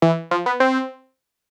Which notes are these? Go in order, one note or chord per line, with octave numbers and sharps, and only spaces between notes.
E3
F3
B3
C4